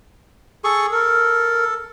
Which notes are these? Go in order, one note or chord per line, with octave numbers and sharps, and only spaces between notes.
G#4 A4 C#6
A4 A#4